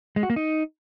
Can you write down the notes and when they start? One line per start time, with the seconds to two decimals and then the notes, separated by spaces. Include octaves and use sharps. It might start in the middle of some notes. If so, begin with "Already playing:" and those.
0.16 G#3
0.23 F#4
0.30 A#3
0.36 D#4